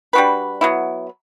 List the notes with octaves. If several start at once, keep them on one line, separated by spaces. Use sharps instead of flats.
G3 D4 F#4 B4
F#3 B3 E4